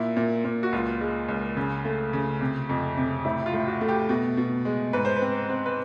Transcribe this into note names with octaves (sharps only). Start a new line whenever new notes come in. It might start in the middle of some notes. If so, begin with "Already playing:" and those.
Already playing: A#2 E4
A#2
A#2
F#4
C#2 F4
G#3
C#2
C#3
A3
C#3
C3
F2
C3
A2 E4
F4
A2
F#4
A3
G4
B2
B2
G#3
G#2 B4
C5
B4
C4
C4
B4